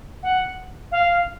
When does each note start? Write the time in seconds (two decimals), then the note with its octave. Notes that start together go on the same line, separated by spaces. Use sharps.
0.23 F#5
0.91 F5